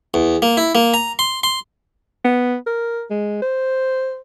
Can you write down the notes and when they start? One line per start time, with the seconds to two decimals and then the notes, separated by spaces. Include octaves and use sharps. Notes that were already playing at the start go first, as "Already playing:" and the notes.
0.14 E2
0.42 A#3
0.57 E4
0.75 A#3
0.94 A#5
1.19 C6
1.43 C6
2.25 B3
2.67 A#4
3.10 G#3
3.42 C5